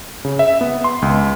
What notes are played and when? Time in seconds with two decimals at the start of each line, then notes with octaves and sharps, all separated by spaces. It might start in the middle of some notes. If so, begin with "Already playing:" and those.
0.25 C#3
0.39 E5
0.61 B3
0.84 C6
1.02 C#2